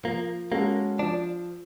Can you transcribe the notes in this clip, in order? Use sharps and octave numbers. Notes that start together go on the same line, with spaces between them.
F3 A#3
G#3 A#3 C#4 F#4 A4
F3 D4